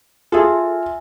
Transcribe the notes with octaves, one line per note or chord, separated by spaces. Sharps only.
F4 G#4 A4 E5 G#5